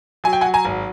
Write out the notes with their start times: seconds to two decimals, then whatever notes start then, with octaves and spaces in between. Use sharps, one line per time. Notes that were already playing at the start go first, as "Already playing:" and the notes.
0.24 F#3 G#5
0.33 G5
0.41 F#3 F#5 G#5
0.54 G#5 A#5
0.65 G#1